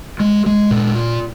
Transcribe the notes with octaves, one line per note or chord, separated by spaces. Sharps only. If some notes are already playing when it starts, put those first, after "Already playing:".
G#3
G#3
A#2